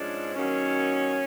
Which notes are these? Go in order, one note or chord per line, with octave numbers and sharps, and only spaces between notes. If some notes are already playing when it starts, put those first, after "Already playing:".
Already playing: G#2 F3 G#3 C#4 D4
D#3 F#3 A#3 C#4